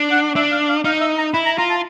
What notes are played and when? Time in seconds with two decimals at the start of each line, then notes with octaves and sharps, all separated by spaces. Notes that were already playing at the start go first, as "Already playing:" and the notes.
Already playing: D4
0.12 F#5
0.36 D4 E5
0.52 F5
0.69 F5
0.84 D#4 F5
1.01 E5
1.18 A#5
1.34 E4 B5
1.45 A#5
1.58 F4 A#5
1.70 A5